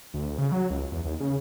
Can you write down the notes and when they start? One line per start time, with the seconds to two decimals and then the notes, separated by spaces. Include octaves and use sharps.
0.14 D2
0.38 C#3
0.52 F#3
0.70 C#2
0.92 E2
1.05 D#2
1.20 C#3